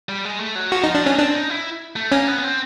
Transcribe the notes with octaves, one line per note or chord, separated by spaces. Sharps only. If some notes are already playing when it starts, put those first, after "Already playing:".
G3
G#3
A3
F#3
F3 F#4
F3 D#4
D4
F#3 C#4
C4 D4
D#4
E4
A3
A#3 C#4
B3
B3
C4